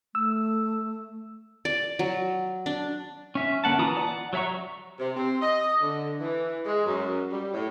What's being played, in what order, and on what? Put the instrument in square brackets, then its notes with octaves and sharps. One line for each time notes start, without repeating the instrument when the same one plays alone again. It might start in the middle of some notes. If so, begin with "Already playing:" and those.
[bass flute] A3 [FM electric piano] E6
[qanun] D5
F#3
D4
[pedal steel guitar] C#4 E5
D3 A#3 F#5 A5
E3 F4 A#5 D#6
D5 F#5
F#3 C#5 E5 A#5 C#6
[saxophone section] C3
C4
D#5
D3
E3
G#3
F#2
G3
A2